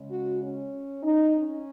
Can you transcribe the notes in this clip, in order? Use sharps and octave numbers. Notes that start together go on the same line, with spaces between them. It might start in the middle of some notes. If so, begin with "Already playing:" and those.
Already playing: C#3 G#3 C#4
F#4
C#4
D#4
C#4